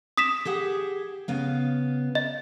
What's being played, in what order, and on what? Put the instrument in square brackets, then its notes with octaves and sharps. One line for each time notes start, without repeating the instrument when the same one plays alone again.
[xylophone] D#6 B6 E7
[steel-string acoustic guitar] G4 G#4 F#5
C#3 B3 F5
[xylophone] D#5